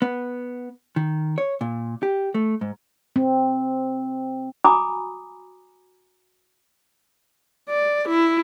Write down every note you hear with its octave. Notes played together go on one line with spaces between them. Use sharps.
B3
D#3
C#5
A#2
G4
A3
G#2
C4
F#4 G#5 A#5 B5 D6 D#6
D5
E4